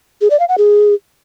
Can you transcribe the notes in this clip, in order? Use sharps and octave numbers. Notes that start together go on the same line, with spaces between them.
G#4
D5
F5
F#5
G#4